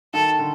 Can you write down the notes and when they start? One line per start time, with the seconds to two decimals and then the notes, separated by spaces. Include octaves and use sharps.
0.14 D#3 A4
0.39 D3